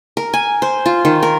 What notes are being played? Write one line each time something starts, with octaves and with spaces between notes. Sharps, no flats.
A#4
G#5
C5
F4
D#3
A#4